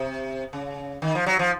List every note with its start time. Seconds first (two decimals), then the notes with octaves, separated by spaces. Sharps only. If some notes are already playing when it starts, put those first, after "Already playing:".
Already playing: C3
0.53 C#3
1.02 D#3
1.15 F3
1.26 F#3
1.39 F3